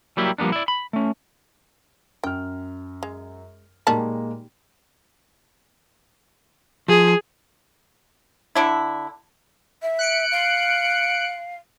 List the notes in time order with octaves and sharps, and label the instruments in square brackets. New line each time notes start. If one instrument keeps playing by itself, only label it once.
[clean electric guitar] F#3 G3 A#3 E4 G4
F3 G3 A#3 B3 D4
E4 D5
B5
A3 C#4
[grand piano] F#2 F6 [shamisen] G5
[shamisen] G#3
[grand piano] A#2 G#3 A#3 [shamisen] D#3 G3 A5
[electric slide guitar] F3 [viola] G#4
[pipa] D3 D4 E4
[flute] E5
[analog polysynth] F#6 C#7 D7
[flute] F5